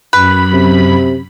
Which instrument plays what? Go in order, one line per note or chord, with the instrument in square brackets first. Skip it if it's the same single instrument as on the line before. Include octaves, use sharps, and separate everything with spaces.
[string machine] F#2 B5 [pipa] B4
[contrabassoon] C3